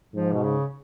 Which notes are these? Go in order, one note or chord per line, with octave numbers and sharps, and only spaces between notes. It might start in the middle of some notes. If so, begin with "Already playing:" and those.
G#2 F3
B2
C#3